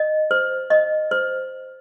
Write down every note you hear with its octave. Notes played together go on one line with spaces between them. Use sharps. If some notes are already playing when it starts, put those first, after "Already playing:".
Already playing: D#5
C5
D#5
C5